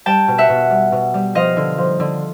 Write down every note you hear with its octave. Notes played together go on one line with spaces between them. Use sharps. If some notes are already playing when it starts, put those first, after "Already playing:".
G3 G5 A5
B2
E5 F#5
B2
G3
B2
G3
F3 D#5 F5
D3
F3
D3